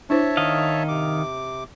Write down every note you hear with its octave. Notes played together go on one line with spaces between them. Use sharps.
D4 E4 C5 C#5 E5 A5
D#3 D#5 F5
C3 D6